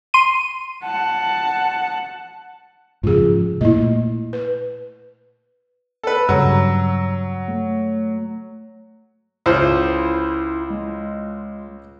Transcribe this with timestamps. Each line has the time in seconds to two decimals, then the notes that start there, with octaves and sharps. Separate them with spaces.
0.14 C6 D#7
0.83 F#5 A5
3.03 G#2 C#3 F3 F4 G#4
3.61 A#2 A3 E4 D#5
4.33 B4
6.03 A4 B4
6.29 G2 C#3 F#3 A#5 E6
7.48 A3
9.46 C#2 E4 F4 C5
10.70 G#3